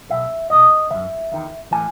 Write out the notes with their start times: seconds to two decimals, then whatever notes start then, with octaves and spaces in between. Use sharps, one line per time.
0.10 B1 B2 E5
0.50 B1 D#5
0.55 B2
0.91 F#2 D#3 E5
1.32 E2 D#3
1.71 A2 E3 G#5